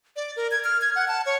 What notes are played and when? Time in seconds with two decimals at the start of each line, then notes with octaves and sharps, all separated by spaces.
0.16 D5
0.36 A#4
0.51 G#6
0.64 F6
0.82 G#6
0.96 F#5
1.08 A5
1.26 C#5